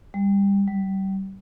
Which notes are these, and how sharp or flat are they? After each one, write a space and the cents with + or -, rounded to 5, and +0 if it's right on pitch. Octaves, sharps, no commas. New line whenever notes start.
G3 +20
G3 -30